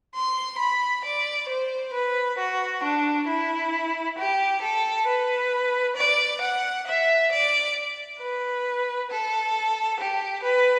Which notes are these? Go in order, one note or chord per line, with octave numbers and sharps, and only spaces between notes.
C6
B5
D5
C5
B4
F#4
D4
E4
G4
A4
B4
D5
F#5
E5
D5
B4
A4
G4
B4